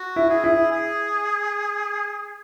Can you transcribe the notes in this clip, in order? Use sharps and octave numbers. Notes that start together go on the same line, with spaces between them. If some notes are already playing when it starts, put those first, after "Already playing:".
Already playing: F#4
E4
G#4
E4
G#4